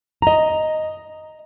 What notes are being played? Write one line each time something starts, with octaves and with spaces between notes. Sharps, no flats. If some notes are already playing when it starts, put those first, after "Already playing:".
D#5 A#5